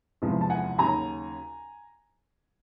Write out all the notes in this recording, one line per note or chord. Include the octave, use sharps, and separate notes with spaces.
F#1 E2 C3 F3 G#3
A5
F#5 G#5
D#2 C#3 F#3 G#5 A#5